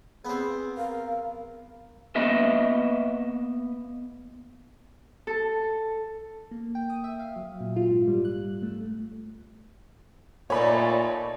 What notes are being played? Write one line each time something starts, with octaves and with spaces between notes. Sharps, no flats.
B3 C4 G#4
A#4 F5
A#3 B3 D#5 E5
A4
A#3
G5
D#6
E5
F5
F#3
A#2
F4
G#2
G3
F#6
A3
A#2 A3 D#4 C#5 D5 G#5 B5